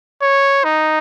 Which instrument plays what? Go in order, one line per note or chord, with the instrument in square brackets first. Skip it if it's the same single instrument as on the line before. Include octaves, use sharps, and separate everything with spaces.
[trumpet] C#5
D#4